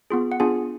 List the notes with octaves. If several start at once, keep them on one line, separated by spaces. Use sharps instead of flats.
B3 F4 G#4
F#5
B3 D4 F4 G#4 G#5